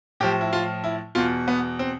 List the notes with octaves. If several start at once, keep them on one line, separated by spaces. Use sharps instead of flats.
A2 F3 G4
E4
F4
E4
E2 B2 F4
B3
C4